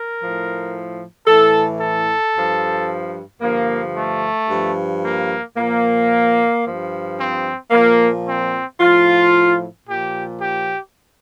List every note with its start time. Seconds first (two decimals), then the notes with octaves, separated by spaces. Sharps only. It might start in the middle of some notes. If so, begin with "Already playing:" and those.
Already playing: A#4
0.18 A2 F3
1.25 A2 E3 A4
1.80 A4
2.33 G2 F3
3.41 G2 D3 F3 A#3
3.94 A3
4.49 G2 F3
5.02 A#3
5.56 A#2 F3 A#3
6.64 G2 F3
7.18 C4
7.71 A#2 F3 A#3
8.25 C4
8.79 A2 F3 F4
9.86 A#2 F3 G4
10.40 G4